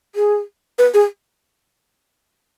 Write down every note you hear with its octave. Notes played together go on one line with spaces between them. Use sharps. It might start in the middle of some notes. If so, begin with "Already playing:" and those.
G#4
B4
G#4